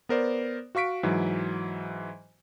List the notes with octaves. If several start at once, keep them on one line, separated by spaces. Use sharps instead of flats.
B3 A#4 C5 D5
F#4 F5 C#6 B6 D7
G#2 E3 F#3